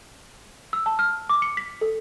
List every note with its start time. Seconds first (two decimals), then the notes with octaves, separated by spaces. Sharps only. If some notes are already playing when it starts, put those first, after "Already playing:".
0.73 E6
0.86 A5
0.99 F6
1.30 D6
1.42 C#7
1.57 B6
1.81 A4